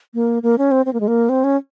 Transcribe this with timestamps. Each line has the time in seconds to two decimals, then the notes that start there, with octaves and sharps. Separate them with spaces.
0.14 A#3
0.43 A#3
0.58 C#4
0.71 C4
0.86 C4
0.93 A#3
1.00 G#3
1.08 A#3
1.29 C4
1.44 C#4